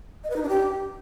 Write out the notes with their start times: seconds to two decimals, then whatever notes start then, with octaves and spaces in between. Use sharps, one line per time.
0.24 D#5
0.30 B4
0.36 D#4
0.42 D4
0.49 G4